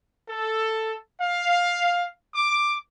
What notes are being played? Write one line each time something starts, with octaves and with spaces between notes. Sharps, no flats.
A4
F5
D6